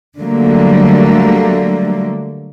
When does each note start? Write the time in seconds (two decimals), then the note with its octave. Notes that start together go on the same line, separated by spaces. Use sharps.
0.20 D3 F#3 G3 A3 A#3